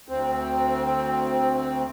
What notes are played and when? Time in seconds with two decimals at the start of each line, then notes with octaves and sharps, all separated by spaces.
0.08 D2 C4